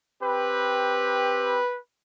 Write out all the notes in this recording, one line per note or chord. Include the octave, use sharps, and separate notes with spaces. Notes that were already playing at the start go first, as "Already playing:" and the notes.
C4 G4 B4